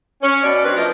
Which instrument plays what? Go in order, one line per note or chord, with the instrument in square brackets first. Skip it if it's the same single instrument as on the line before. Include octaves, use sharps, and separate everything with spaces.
[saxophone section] C#4
B2 D5
F#3 A#3 C4 D4 B4
F3 A3 A#4 D#5